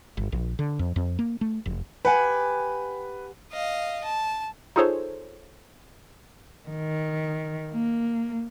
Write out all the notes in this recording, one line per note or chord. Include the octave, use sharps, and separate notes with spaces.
G1
A#1
D3
F2
F2
A#3
A3
F1
G4 B4 F#5 G#5
D#5 F5
A5
D#4 F4 G#4 A4 C5 C#5
D#3
A#3